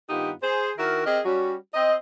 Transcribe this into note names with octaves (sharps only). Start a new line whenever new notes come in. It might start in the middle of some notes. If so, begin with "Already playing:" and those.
G2 D#3 B3 D#4 F4 G4
G#4 C5
D#3 E4 F#4 A#4
C4 G4 G#4 A#4 D#5
G3 C#4 F#4
C4 D#5